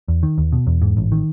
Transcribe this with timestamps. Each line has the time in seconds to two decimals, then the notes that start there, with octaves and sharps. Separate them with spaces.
0.08 E2
0.23 D#3
0.38 D#2
0.52 B2
0.67 E2
0.82 G#2
0.97 A1
1.12 D#3